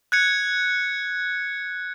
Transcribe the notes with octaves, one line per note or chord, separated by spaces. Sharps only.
F#6 G#6 C#7